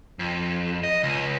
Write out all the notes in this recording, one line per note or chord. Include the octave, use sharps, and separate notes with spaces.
F2
D#5
C#2